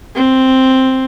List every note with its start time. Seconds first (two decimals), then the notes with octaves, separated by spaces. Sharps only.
0.15 C4